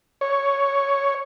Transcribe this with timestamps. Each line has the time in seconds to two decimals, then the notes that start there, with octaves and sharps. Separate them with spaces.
0.21 C#5